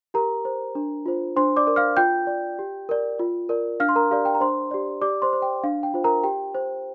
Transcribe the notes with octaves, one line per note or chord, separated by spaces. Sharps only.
G4 A#4 A#5
C5
D4
F4 C5
D4 C5 C6
D5 D6
A#4 D5
F5 F6
F4 G5 G6
D5
G4
A#4 D5
F4
A#4 D5
D4 F5 F6
C6
A#4 A#5
G4 A#4 D5 F5
G5
A#5
D4 C5 C6
G4 D5
G4 D5 D6
C5 C6
C5
G5
D4 F5
G5
F4 C5
A#4 A#5
G4 G5
C5